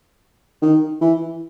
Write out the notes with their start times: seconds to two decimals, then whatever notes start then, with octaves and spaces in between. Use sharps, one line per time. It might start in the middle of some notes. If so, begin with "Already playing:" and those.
0.62 D#3
1.01 E3